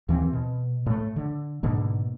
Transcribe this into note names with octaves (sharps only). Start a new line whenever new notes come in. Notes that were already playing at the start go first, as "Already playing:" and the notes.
D#2 E3 G#3 C4
B2
A2 A3
D3
G#2 B2 D3 A#3